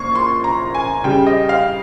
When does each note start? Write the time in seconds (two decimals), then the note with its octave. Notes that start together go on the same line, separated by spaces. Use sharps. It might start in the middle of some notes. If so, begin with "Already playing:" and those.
Already playing: A#2 F3 C#6 C7
0.15 C6
0.44 A#5
0.75 G#5
1.04 C#3 G3 G5
1.27 D#5
1.49 F5